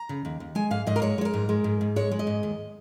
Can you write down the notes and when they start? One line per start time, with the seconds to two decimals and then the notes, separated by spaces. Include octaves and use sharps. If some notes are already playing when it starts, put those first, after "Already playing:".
Already playing: A#5
0.09 C#3
0.25 D#2
0.40 D#2
0.55 G#3 G#5
0.71 G#2 F5
0.87 G#2 D#5
0.96 A#4
1.02 G#3 C#5
1.18 G#3 C#5
1.25 A#4
1.34 G#2
1.49 G#3
1.64 G#2
1.81 G#2
1.96 G#3 C#5
2.11 G#3
2.19 D#5
2.27 G#2
2.43 D#2